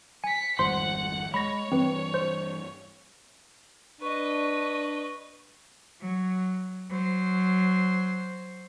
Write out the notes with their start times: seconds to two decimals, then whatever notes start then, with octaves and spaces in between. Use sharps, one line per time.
0.24 G#5 B6 C#7
0.59 G#1 F2 G3 C5 F#5 C6
1.34 G#3 C#5 B5 A#6
1.72 G2 E3 C4 B4
2.14 C5
4.01 D4 B4 D#5 C#6
6.00 F#3
6.90 F#3 C5